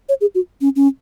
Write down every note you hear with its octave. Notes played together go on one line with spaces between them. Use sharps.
C#5
G#4
F#4
C#4
C#4